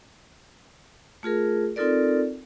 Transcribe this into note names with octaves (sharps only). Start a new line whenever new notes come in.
A3 F4 G#4 A#4
C4 D#4 F4 A4 A#4 D5